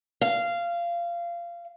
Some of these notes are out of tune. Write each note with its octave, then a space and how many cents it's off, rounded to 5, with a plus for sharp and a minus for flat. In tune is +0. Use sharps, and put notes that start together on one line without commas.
F5 -20